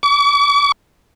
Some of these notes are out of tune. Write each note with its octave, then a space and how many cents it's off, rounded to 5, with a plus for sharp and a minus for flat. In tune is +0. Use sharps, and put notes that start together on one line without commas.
D6 -45